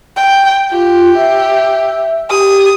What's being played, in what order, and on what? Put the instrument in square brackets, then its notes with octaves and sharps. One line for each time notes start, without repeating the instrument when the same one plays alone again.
[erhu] G5
[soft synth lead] F4 [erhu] G4
[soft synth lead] E5
[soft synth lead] G4 [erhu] D#6